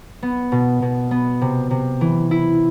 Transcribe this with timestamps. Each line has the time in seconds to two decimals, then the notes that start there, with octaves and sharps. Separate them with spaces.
0.23 B3
0.52 B2
0.82 B2
1.11 B3
1.41 C3
1.71 C3
2.01 E3
2.31 E4